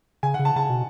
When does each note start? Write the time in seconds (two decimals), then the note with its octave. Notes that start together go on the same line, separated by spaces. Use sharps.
0.23 C#3 G#5
0.34 F#5
0.39 C#3
0.45 A5
0.56 C#3 A5
0.70 B2